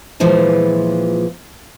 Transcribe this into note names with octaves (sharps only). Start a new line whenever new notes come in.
A#2 E3 F3 G#3